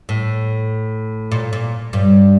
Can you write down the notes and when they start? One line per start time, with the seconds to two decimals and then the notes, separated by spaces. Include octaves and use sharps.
0.09 A2
1.31 A#2
1.53 A#2
1.93 G2